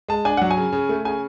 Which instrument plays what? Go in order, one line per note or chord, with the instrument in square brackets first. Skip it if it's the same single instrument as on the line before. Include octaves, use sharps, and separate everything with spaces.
[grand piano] G#3 A5
D4 G#5
F#3 F#5
G#5
C#3
C#3
A3
C#3 G#5